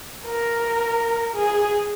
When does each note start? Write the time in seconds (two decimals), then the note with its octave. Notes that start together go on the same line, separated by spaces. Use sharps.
0.26 A#4
1.35 G#4